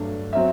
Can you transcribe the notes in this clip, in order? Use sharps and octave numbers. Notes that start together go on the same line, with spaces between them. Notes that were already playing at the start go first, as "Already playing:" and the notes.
Already playing: G2 F#3 A3 D4
F#3 C4 E5